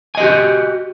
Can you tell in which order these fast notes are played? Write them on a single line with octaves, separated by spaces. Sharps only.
G#5 D#5 G4 F#4